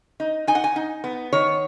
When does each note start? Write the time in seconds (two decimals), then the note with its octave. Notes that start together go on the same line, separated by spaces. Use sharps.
0.20 D#4
0.47 D#4 G#5
0.55 F#5
0.64 G#5
0.76 D#4
1.04 B3
1.32 D#3 C#5